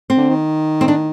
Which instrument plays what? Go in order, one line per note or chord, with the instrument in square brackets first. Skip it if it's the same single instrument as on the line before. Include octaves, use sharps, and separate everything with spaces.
[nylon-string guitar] C4
[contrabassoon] D3
D#3
[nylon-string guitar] C4
D4